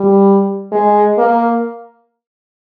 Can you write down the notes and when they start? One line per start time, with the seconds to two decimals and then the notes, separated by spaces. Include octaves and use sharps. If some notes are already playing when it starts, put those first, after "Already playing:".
Already playing: G3
0.72 G#3
1.18 A#3